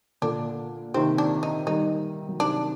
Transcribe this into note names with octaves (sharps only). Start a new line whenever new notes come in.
A#2 D3 D4
C3 D#3 C4
D4
D#4
D#3 G3 D#4
F#3
C3 D#3 D4